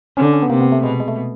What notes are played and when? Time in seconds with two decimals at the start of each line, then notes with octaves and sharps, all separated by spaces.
0.17 D3 C#4
0.25 D4
0.33 C#4
0.42 B3
0.50 C3 A#3
0.61 B3
0.72 A3
0.83 B2 G#3
1.00 G#3
1.08 A3